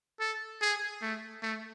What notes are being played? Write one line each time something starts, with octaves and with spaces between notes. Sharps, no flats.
A4
G#4
A3
A3